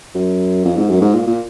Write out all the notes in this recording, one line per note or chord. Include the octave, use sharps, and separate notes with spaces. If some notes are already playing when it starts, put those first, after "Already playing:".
F#2
F2
G#2
F#2
G#2
A#2
A#2